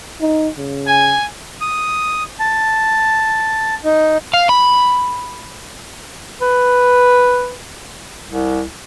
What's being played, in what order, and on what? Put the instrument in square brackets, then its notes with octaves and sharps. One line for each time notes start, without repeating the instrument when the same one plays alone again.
[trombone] D#4
C#3
[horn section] G#5
[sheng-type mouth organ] D#6
A5
D#4
[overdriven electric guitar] F5
B5
[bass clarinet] B4
C2